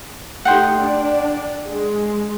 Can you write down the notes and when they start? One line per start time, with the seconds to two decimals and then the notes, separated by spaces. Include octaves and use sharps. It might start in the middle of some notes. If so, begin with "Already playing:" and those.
0.45 A3 D#4 G4 F#5 G5 C6
0.80 D4 D5
1.68 G#3